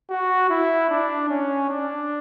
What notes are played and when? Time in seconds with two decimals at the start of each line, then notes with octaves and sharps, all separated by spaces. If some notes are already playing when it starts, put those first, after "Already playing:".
0.10 F#4
0.50 E4
0.90 D4
1.30 C#4
1.69 D4